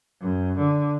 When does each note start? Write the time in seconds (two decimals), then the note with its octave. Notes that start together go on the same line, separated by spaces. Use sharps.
0.21 F#2
0.57 D3